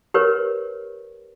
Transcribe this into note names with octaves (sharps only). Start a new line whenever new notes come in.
G4 A#4 B4 C#5